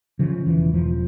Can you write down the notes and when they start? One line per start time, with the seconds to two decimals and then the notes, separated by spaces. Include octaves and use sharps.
0.19 C#3 F3
0.46 E1 E3
0.73 E1 F3